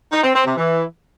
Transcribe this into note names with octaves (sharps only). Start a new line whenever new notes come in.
D#4
C4
C4
C3
E3